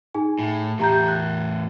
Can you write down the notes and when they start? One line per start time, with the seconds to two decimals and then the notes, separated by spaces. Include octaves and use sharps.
0.15 D#4 G#4 G#5
0.39 A2
0.79 E2 A2 G4 A#5 G6
1.08 F#6